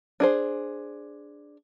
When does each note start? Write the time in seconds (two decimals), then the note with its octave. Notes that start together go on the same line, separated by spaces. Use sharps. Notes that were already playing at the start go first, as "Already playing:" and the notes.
0.20 D4 G#4 C5